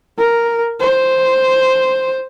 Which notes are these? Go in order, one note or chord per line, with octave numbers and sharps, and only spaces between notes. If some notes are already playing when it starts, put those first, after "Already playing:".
A#4
C5